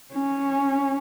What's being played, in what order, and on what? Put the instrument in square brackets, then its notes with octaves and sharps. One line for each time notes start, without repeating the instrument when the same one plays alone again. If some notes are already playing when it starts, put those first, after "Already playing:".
[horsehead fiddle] C#4